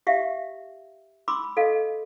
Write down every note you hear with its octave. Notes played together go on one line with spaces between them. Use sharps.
G4 E5 F5
B5 C6 D6 E6
A4 D#5 F5